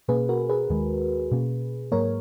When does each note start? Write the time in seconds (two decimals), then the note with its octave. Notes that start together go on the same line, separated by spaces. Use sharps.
0.09 B2 A#3 C#4 G#4 B4
0.29 F#4 A#4
0.49 G#4 B4
0.70 D#2 D#3 G#3
1.31 B2 A#3 C#4
1.92 G#2 F#3 A#3 A#4 C#5